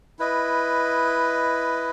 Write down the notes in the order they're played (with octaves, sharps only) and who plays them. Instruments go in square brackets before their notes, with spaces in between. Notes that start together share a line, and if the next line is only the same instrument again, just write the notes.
[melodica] E4 B4 D#5